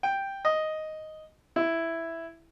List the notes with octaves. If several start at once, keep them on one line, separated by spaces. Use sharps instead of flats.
G5
D#5
E4